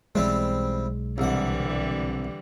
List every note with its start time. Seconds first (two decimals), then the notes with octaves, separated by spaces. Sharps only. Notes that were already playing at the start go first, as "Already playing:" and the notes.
0.15 B1 E3 G3 G#3 C4
1.18 C2 D3 E3 G3 F#5